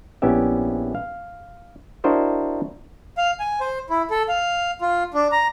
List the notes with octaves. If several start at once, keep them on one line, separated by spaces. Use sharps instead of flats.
A#1 B3 C#4 E4 G4 E5
F5
D4 E4 F#4 A#4 C5 D#5
F5
G#5
C5
E4
A4
F5
F4
D4
A#5